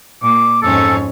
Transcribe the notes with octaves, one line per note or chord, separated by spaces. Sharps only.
A#2 D6
F2 G#2 C#4 A4